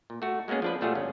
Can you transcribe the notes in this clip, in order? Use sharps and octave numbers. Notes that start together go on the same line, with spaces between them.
A#2
A3 F#4
G#3 A#3 B3 C#4 G#4
F3 D4 B4
A#2 G3 A3 F4 F#4 G#4
G1 C#4